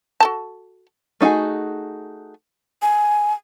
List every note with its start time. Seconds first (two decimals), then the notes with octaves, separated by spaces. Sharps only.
0.20 F#4 A4 A5
1.21 A3 D#4 F4 F#4 G#4
2.82 G#5